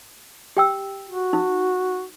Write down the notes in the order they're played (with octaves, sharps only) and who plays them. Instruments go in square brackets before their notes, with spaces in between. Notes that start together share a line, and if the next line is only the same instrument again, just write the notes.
[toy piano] G4 G5 E6
[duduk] F#4
[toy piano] D#4